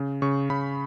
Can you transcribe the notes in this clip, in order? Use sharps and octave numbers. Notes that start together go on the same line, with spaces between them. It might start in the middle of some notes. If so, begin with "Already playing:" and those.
Already playing: C#3
C#3 C#6
C#3 B5